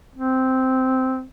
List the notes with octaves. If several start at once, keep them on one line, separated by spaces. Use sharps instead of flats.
C4